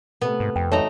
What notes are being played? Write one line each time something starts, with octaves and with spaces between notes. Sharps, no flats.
C3 A3 B3
G#2
F2 G5
G#1 A3 D#4 C#5 A#5